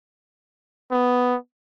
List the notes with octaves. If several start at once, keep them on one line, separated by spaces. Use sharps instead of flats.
B3